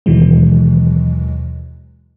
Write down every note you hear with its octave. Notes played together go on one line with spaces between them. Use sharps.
D#2 B2 D#3 E3 F#3 G#3